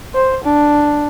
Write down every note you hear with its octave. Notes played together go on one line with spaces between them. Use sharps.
C5
D4